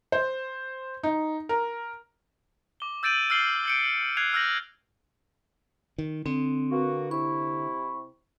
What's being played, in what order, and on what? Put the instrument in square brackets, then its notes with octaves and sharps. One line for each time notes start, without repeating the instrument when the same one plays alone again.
[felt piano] C5
D#4
A#4
[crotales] D6 G7
E6 G6 A6 D7 D#7 F#7
E6 F6 A6 C7 F#7 G7
G6 C#7 D7
F#6 G#6 C7 F7
E6 F6 G6 A#6 F#7
[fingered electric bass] D#3
[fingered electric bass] D3 [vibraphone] C4
[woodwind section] A#3 B3 F#4
[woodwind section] C3 E4 [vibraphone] C#6